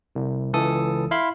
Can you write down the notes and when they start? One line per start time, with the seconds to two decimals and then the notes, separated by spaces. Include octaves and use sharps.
0.15 C2
0.53 C#2 E3 A4 D#6
1.11 E4 F5 B5 C6